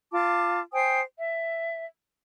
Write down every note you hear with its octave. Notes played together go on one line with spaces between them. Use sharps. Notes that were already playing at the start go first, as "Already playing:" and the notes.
F4 A5 D6
C5 G5 G#5 D#6
E5